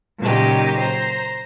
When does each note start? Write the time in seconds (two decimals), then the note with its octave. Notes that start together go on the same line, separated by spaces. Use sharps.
0.20 A#2 C#3 F#3 D#4 G4
0.80 C5 A#5